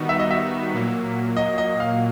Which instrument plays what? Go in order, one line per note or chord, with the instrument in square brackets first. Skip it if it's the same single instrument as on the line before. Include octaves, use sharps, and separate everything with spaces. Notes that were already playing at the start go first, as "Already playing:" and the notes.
Already playing: [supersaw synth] D#3 G3 B3 D#4 F#4
[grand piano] E5
D#5
E5
[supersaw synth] A#2 F#3 A#3
[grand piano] D#5
D#5
F5